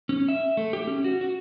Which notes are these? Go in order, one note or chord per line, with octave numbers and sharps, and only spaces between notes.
C#4
E5
A3
G4
C#4
F#4
F#4